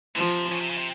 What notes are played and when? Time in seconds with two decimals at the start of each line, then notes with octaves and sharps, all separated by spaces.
0.15 C3 F3
0.52 C#3
0.61 C3
0.70 C#3
0.77 C3